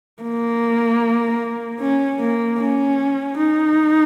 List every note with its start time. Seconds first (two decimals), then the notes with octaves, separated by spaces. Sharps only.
0.23 A#3
1.80 C#4
2.20 A#3
2.58 C#4
3.37 D#4